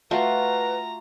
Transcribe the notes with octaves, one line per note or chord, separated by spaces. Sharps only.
A3 F4 F#4 B4 A#5